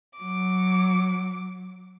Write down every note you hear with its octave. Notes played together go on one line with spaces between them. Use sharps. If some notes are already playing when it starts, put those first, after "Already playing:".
F#3 D6